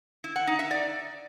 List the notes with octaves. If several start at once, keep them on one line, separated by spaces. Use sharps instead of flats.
E4
F#5
D#4
E5
D5